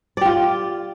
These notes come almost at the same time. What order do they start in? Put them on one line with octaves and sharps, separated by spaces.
D5 G4 F4